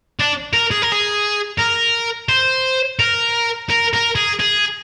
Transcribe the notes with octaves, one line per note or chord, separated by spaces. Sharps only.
D4
A#4
G#4
A#4
G#4
A#4
C5
A#4
A#4
A#4
G#4
G#4